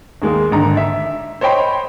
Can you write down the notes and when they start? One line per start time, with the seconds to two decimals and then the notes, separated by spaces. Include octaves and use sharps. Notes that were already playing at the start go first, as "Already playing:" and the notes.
0.22 D#2 G#3 A#3
0.52 G#1 D3 A#5
0.77 E5
1.41 C5 C#5 D#5 G5 B5 C6